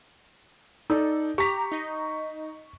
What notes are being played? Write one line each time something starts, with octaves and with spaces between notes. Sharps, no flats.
D#4 A4 D5
G4 A#5 C#6 B6
D#4 D#5